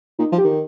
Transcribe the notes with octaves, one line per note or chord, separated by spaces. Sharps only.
A#2 D#4
F3
G4
D#3